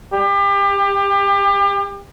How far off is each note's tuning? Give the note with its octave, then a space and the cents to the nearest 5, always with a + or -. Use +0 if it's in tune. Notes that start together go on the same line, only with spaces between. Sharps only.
G4 +30